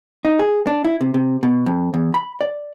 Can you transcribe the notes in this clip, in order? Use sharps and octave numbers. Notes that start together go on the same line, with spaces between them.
D#4
G#4
D4
E4
C3
C3
B2
F2
E2
B5
D5